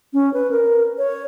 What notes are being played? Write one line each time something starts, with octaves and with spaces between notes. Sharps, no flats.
C#4
B4
A#4
C#5